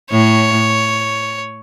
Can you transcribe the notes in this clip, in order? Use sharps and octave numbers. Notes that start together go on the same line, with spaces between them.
A2 C#5